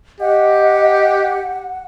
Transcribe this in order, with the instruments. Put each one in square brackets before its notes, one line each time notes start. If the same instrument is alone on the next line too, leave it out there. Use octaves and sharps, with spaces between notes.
[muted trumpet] G4 [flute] D#5 [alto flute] F#5